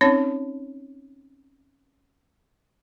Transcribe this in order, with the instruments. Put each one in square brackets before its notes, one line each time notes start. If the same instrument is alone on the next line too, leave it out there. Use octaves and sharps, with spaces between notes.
[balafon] C4 C#4 D#4 C#5